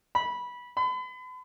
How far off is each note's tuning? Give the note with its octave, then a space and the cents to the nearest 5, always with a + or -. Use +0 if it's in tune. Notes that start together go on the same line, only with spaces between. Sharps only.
B5 -15
B5 +40